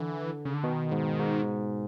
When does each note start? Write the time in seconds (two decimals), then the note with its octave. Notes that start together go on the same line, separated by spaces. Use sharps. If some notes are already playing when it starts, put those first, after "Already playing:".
Already playing: D3 E3
0.45 C#3
0.54 D3
0.64 B2 D#3
0.92 G#2
1.19 G#2